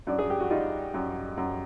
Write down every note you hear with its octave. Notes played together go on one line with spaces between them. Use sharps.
F#2 D4
G#4
G4
F#4
G3 D#4 F4
F#2
F#2